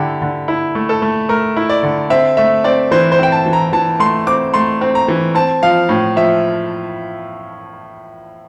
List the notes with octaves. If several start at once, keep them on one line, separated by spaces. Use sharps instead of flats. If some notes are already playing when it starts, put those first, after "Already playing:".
Already playing: D3 E4 G4
D3
E4
A3
A4
A3
A3 A#4
E4
D5
D3
C4 E5
A3 E5
C4 D5
E3 C5
C5
C4 G5
A5
E3
A#5
E3 A5
A3 C6
C4 D6
A3 C6
C4
A#5
E3
C4 A5
F3 F5
A2
F3 E5